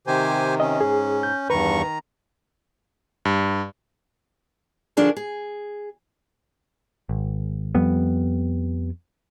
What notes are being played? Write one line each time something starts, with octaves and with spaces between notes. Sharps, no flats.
C3 D#3 G4 C5 G#5
C#4 D#5
G#2 G#4
G6
E2 G2 D#3 B4 A#5 C#6
G2
D3 F3 D4 F#4 G#4 A#4
G#4
G#1
F2 G3 B3